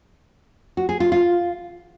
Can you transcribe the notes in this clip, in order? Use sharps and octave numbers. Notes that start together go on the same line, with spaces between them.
F#4
G#4
F4
F4